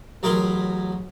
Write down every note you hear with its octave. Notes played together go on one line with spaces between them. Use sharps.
A1 F#3 G#4 A#4 B5 C6